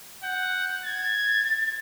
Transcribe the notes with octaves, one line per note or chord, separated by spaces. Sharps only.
F#5 G6
G#6 A6